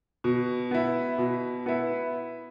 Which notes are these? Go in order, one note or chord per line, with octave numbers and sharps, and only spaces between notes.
B2
B3 E4
B2
B3 E4